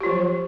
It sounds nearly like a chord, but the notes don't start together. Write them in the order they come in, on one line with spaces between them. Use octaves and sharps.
G4 F4 F#3 F3